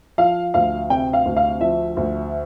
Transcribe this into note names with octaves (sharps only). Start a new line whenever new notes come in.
F3 F5
D2 F5
C3 G5
F5
D2
F5
F3 E5
D2